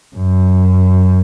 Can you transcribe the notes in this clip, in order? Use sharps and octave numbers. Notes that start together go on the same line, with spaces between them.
F#2